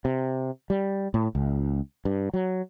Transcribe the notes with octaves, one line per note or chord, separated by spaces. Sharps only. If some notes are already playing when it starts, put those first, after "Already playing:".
C3
G3
A2
C#2
G2
F#3